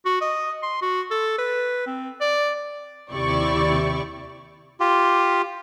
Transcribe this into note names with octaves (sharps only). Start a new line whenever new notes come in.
F#4
D#5
C6
F#4
A4
B4
C4
D5
D#2 C3 E4 G4 D5 C#6
F4 G4